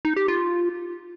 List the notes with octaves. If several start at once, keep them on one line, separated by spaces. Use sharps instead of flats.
D#4
G4
F4